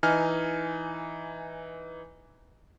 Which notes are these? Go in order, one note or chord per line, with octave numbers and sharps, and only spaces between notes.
E3 D#4 G#5 F6